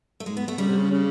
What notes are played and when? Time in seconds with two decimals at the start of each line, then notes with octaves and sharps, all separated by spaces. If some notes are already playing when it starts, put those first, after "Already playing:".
0.20 A3
0.26 G#2 G#3
0.37 B3
0.48 A3
0.58 C#3 G3
0.68 C3
0.77 C#3
0.91 C#3